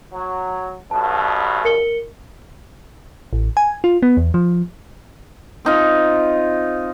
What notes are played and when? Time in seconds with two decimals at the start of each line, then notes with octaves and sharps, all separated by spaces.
0.14 F#3
0.91 B1 G2 B2 A5
1.65 A#4 C#7 G7
3.33 A1
3.57 G#5
3.84 F4
4.03 B3
4.17 E2
4.34 F3
5.65 C4 D#4 F4